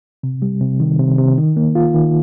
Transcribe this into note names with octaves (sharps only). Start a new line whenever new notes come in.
C3
G3
C3
D#3
C3
C3
D#3
A#3
F4
D#3